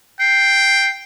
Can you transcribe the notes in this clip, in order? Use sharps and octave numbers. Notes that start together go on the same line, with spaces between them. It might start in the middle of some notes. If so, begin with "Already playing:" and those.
G5 C7